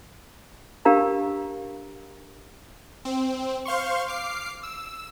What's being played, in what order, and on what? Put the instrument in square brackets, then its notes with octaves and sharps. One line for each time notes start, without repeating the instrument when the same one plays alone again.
[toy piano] D4 G4 A#4 F5 A#5
[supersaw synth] C4
C5 F5 C6 C#6
D6 F6 C7
E6